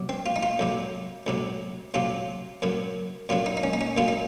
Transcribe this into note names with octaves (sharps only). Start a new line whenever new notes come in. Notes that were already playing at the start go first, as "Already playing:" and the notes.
Already playing: C3 F#3
C4
F4
D#4
F4
F2 C3 F#3
F2 C3 F#3
F2 C3 F#3 F4
F#2 C#3 F#3
F#2 C#3 F#3 F4
D#4
D#4
C#4
D#4
C#4
F#2 C#3 F#3 F4
D#4